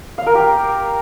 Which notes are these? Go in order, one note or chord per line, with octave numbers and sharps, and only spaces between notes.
F5
A#4
G4